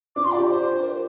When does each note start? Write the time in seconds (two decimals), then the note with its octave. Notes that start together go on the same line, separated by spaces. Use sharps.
0.16 D4 D6
0.24 F4 C6
0.33 D5
0.38 G4
0.50 C5
0.83 A#4
0.91 C5